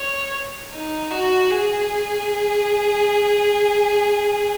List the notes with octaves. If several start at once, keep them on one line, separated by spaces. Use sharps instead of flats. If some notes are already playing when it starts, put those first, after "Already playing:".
Already playing: C#5
D#4
F#4
G#4